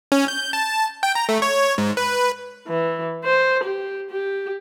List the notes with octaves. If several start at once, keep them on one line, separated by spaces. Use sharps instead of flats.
C#4
G6
A5
G5
A#5
A3
C#5
G#2
B4
E3
C5
G4
G4